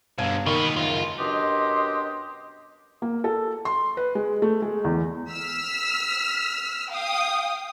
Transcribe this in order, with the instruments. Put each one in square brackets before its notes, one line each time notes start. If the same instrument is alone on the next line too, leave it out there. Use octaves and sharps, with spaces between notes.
[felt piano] G1 F5 G#6 [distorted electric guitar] B2 D3
[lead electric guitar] B2 [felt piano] D#3 A#3 D#4 [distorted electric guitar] B3 F4
[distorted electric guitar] C#2 F#2 [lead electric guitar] F4
[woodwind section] F#2 B2 D4 G4 D#5 C6
[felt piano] A#3
A4
C6
B4
G#3
A3
G#3
E2
[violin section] E6 F6 B6
F5 G5 D#6